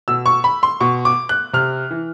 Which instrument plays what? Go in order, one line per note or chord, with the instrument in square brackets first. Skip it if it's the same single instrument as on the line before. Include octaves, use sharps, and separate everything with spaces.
[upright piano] B2 E6
C#6
B5
C6
B2 C#6
D6
F#6
C3 F6
E3